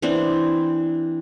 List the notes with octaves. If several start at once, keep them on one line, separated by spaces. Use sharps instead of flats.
E3 C4 D4